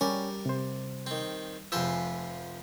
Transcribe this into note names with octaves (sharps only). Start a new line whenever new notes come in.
G3 C#4 A#4 D5
C3 C5
D#3 C4
F1 F3 B4 C5 G#5 E6 B6